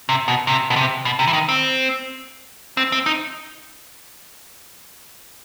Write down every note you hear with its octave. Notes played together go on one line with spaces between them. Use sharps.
C3
B2
C3
B2
C3
B2
C3
E3
D#3
C4
C4
C4
D#4